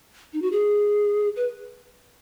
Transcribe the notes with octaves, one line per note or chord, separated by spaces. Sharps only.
D#4
F#4
G#4
B4